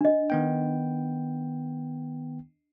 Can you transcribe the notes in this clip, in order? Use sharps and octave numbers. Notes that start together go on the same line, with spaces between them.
D4 D#5
D#3 B3 G5